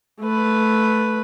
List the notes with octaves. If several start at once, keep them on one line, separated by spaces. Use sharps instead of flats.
A3 B4